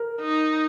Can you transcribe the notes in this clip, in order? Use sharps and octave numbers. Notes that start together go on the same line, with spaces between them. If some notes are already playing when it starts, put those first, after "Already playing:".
Already playing: A#4
D#4